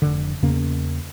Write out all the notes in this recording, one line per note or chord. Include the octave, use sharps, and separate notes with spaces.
F1 D3
E2 C#3 A#3 C#4